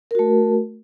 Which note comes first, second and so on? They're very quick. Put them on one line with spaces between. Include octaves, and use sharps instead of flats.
A#4 F#4 A3